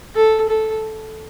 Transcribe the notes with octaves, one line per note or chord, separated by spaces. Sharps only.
A4
A4